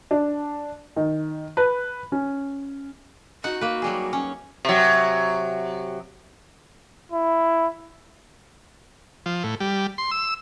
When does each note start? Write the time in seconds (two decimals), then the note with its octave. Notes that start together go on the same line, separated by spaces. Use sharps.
0.11 D4
0.96 D#3
1.57 B4
2.12 C#4
3.44 D#4 F#4 F#5
3.61 A#3 B4
3.82 F#3 G3 G#4
4.13 C#4
4.65 C3 F#3
7.12 E4
9.26 F3
9.44 A2
9.60 G3
9.98 C6
10.11 E6